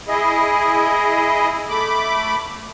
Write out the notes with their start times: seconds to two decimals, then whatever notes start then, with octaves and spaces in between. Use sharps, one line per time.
0.08 E4 G#4 D#5
1.69 A3 B5 D6